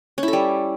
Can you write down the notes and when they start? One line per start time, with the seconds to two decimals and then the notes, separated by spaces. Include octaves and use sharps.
0.18 C#4
0.23 E4
0.28 A4
0.33 G3